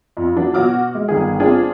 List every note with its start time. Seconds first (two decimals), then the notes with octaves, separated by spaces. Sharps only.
0.17 F2
0.36 E3 F#3 D4
0.54 B2 F#4 C#5 D6 F6
0.95 G#3
1.08 G1 D#3 G#4
1.40 C4 D4 F4 G#4